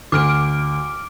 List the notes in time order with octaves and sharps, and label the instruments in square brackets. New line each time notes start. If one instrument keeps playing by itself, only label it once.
[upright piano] D2 [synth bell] D6 F6 D7